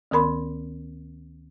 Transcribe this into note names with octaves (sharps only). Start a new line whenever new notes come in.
D2 D#3 B3 A#4 B5 C6